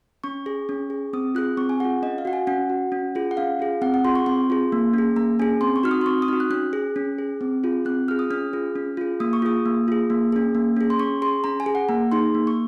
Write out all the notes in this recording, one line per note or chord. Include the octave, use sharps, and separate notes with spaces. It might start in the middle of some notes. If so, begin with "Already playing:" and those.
C#4 C#6
G#4
C#4
G#4
C4 D#6
F4 G#4 F#6
C4 C#6
G#5
F4 G#4 F#5
C#4 D#5
F5
F#4 F#5
G#5
C#4 F#5
F#4
C#4
F4 G#4
F#5
C#4 F5
F4 G#4
C4 F#5
F#5
F4 G#4 C6
C#6
C4 C6
F4 G#4
A#3
C#4 G#4
A#3 A#5
C#4 G#4 G#5
C4 C6
C#6
D#4 F#4 F6
D#6
C6
C4 C#6
D#6
D#4 F#4 F6
F#6
C#4 F#6
G#4
C#4
G#4
C4
F4 G#4
C4 F#6
F4 G#4 F6
D#6
C#4 F6
F4 G#4
C#4
F4 G#4
A#3 D#6
C#6
F4 G#4 D#6
A#3
F4 G#4
A#3
C#4 G#4
A#3
C#4 G#4
C6
C#4 C#6
G#4 C6
C#4 A#5
G#5
G#4
F#5
A#3 A#5
D#4 G#4 C6
A#3
C#6